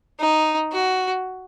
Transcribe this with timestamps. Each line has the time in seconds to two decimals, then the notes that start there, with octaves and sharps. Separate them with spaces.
0.20 D#4
0.72 F#4